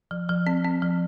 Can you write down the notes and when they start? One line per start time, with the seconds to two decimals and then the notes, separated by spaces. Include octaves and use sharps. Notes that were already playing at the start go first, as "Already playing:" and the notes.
0.11 F3
0.29 F3
0.47 C4
0.65 C4
0.82 F3